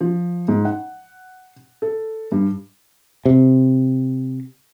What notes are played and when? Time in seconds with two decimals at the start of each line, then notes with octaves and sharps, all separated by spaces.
0.01 F3
0.48 G#2
0.65 F#5
1.82 A4
2.32 G2
3.25 C3